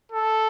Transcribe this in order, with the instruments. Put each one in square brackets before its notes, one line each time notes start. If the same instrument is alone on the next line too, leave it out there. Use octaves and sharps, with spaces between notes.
[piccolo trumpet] A4